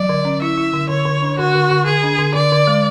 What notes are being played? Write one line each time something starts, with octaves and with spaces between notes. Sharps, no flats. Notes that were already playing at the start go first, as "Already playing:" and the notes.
Already playing: F#3 D5
D3
C#4
E4 E5
E4
D3
D3 C#5
D3
D4
D3 F#4
D3
D3
D3 G#4
D4
D3
D3 D5
D3
G#3